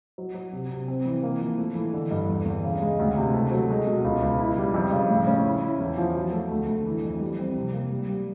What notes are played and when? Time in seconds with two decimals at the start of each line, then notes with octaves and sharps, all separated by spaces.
0.18 F#3
0.34 F#3
0.52 C3
0.70 C3
0.88 C4
1.05 E3
1.23 A#3
1.41 F3
1.58 A3
1.75 E3
1.93 D3
2.11 G2
2.29 E2
2.45 E2
2.64 C#3
2.81 G#3
2.99 D2
3.16 C3
3.34 A3
3.51 F#3
3.70 G#3
3.87 B2
4.04 C#2
4.22 C#2
4.39 E4
4.57 G3
4.74 F2
4.92 C#3
5.10 A2
5.27 C#4
5.45 E4
5.63 E4
5.80 E2
5.98 F3
6.16 F#3
6.32 A3
6.51 D2
6.68 D2
6.85 E3
7.03 F2
7.20 G3
7.39 C4
7.56 C3
7.73 A#3
7.91 G3
8.08 G3